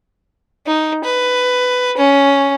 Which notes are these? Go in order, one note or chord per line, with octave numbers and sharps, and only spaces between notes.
D#4
B4
C#4